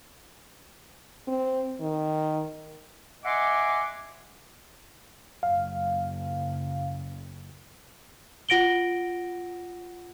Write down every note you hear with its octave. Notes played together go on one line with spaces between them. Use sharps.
C4
D#3
D#5 E5 F#5 G#5 C6 D6
F#1 F5
F4 F#5 A#6 D7 F#7 G7